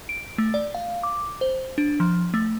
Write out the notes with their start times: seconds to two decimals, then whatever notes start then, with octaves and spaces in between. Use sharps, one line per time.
0.09 D7
0.38 A3
0.54 D5
0.75 F5
1.03 D6
1.41 C5
1.78 D4
2.00 F3
2.34 A3